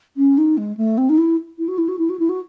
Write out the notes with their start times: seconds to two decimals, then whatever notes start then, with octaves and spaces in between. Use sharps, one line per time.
0.17 C#4
0.38 D#4
0.57 G#3
0.77 A3
0.98 C4
1.09 D#4
1.18 E4
1.59 E4
1.68 F#4
1.78 E4
1.88 F#4
1.99 E4
2.10 F#4
2.19 E4
2.29 F#4